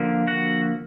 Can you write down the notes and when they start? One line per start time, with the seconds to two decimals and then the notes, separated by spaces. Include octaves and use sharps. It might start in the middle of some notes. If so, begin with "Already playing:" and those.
Already playing: D3 F3 A#3
0.27 F#4 F#5